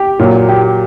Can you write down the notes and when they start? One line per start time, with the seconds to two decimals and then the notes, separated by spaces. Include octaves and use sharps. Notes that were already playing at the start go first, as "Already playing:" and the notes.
Already playing: G4
0.19 A#2 F#3
0.48 G4